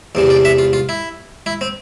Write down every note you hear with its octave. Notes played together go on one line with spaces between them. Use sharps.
E2 C3 E3
D5
E5
F4
F4
E4
E4
C4